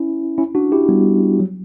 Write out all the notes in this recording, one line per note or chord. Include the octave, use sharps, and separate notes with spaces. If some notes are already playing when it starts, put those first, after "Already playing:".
Already playing: C#4 E4
C#4 E4
D4 F#4
E4 G4
G3 B3
F#3